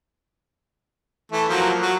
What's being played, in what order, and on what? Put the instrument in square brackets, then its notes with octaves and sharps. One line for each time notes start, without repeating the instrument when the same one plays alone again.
[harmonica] E3 A3
F3 F#3 A#3
F#3